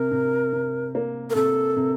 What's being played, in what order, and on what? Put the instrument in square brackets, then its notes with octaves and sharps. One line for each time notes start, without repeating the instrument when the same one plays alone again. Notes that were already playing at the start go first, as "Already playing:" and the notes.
Already playing: [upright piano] C3 [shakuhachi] A#4
[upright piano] C3
C3
A#3
[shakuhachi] A#4
[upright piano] C3 [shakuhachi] A4
[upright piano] C3